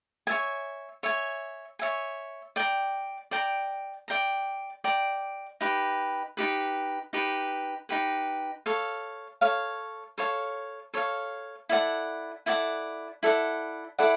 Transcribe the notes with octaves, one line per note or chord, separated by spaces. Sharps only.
C#5 E5 G#5
C#5 E5 G#5
C#5 E5 G#5
D5 G5 A#5
D5 G5 A#5
D5 G5 A#5
D5 G5 A#5
D#4 G4 B4
D#4 G4 B4
D#4 G4 B4
D#4 G4 B4
A4 C#5 F5
A4 C#5 F5
A4 C#5 F5
A4 C#5 F5
E4 A4 D5 F#5
E4 A4 D5 F#5
E4 A4 D5 F#5
E4 A4 D5 F#5